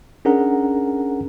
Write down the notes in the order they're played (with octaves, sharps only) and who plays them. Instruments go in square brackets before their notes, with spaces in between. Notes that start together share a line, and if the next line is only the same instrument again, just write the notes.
[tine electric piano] C#4 D4 G#4 A#4 F#5 A#5